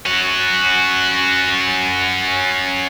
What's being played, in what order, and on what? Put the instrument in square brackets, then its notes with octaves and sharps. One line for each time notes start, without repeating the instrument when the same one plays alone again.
[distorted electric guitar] C#4 F#4